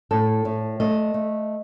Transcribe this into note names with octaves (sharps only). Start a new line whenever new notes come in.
A2 A4
A2
A3 D#5
A3